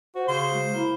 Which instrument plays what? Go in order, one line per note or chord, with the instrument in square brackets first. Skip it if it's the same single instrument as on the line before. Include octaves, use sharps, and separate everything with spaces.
[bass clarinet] F#4 [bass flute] C5
[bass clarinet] C#3 [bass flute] F#4 [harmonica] C5
[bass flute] G#3
[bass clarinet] A#3 [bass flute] E4